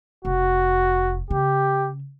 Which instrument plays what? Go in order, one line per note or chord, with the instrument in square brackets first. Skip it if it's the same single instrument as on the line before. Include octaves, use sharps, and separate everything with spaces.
[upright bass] F1 [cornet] F#4
[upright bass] C#3 [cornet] G4